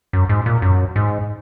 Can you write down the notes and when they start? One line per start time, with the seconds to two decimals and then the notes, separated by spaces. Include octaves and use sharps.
0.13 F#2
0.29 G#2
0.46 A#2
0.62 F#2
0.96 G#2